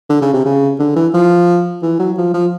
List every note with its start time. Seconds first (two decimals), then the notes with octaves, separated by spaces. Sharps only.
0.09 D3
0.22 C#3
0.34 C3
0.45 C#3
0.79 D3
0.96 E3
1.14 F3
1.82 E3
2.00 F#3
2.18 F3
2.34 F3